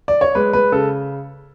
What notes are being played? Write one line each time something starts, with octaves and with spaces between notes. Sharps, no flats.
D5
C#5
G#3 B4
G#3 B4
C#3 A4